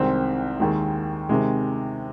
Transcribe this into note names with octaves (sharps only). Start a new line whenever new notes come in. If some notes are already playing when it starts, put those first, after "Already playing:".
Already playing: C2 C3 D#3 G#3 C4
D#2 D#3 G#3
C3 D#3 G#3